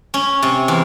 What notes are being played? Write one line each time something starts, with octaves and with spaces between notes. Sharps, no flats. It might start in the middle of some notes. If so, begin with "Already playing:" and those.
C#4
C3
E2